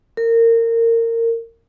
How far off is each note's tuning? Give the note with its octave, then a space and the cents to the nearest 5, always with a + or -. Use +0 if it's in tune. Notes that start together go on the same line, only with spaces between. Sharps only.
A#4 -25